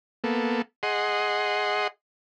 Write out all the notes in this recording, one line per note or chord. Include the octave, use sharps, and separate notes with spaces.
A#3 B3 A4
G#4 D#5 F#5 C6